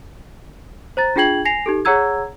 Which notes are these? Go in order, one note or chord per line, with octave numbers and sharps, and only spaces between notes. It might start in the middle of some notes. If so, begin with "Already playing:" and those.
C5 A#5 A6
D4 F4 G#4 G5 G#6 F#7
G#5 A#6 C7 F7
D#4 G4 A4
G#4 C#5 F#5 A#5 E6 G#6